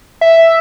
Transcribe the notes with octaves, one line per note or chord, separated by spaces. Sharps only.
E5